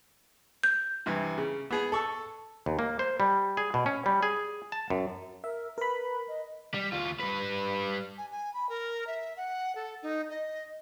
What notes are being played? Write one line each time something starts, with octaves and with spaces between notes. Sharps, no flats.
G6
G2 C3 E3
C#3
B3 G#4 G#5
A4 C#6 E6
D#2
A#3
C5
G3
G#4
B2
C#4
G3
G#4
A5
F#2
A#4 E5
A#4 B4 B5
D#5
G3
D2 F4
G3 B4
G#5
G#5
B5
A#4
E5
F#5
A4
D#4
D#5